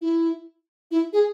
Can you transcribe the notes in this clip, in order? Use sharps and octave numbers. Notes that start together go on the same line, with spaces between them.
E4
E4
G#4